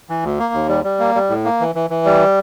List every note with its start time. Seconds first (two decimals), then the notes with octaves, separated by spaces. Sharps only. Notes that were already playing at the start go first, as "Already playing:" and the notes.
0.09 E3
0.24 D2
0.39 A#3
0.54 D#2
0.69 G3
0.84 G3
1.00 A#3
1.15 G3
1.30 A2
1.45 A#3
1.60 E3
1.75 E3
1.90 E3
2.05 G3